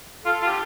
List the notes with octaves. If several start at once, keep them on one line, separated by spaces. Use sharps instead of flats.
F4 A4
F4
G4